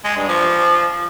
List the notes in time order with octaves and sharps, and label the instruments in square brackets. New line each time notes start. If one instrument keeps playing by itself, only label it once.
[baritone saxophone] G#3
G2
F3